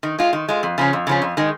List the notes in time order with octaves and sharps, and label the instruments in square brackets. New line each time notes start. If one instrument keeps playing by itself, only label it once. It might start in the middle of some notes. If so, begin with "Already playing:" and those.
[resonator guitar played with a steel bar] D#3
G#3 F4
D#3
G#3 F4
F2
C#3 F3 C#4
F2
C#3 F3 C#4
F2
D#3 G#3